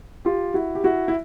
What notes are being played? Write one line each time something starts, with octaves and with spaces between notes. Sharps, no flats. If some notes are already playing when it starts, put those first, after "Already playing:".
F4 G4
E4 F#4
G4
E4 F#4
E4